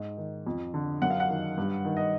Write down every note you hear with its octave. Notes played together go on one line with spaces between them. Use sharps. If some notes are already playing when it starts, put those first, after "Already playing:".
Already playing: G#2
D#3
F2
D3
F#2 F#5
F5
F#5
D#3
G2
D#3
D#5